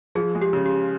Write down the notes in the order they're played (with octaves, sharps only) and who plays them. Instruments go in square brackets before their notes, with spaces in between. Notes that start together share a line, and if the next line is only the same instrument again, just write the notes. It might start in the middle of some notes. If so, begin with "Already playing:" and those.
[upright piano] F3 [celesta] G#4
[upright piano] G#3
[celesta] G4
[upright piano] C#3
[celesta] G4